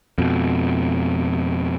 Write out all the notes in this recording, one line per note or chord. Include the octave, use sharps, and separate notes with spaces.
F2 B2